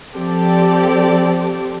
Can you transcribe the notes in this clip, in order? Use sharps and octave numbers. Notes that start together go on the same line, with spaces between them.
F3 C4 G4 A4 D5